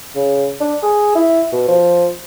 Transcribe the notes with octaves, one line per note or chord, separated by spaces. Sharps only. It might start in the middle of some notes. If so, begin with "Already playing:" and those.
C#3
D4
G#4
E4
B2
F3